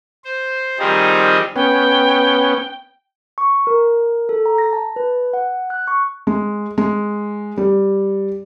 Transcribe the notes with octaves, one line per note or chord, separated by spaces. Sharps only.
C5
D#3 F3 G3 C4 D#4 G#4
B3 C#4 G5
C#6
A#4
A4
A#5
A#6
A5
B4
F#5
F#6
C#6
G#3
G#3
G3